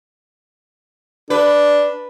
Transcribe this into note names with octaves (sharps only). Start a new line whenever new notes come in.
D4 B4